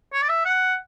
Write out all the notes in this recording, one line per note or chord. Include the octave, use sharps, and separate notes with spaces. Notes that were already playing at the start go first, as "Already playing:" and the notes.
C#5
D5
E5
F#5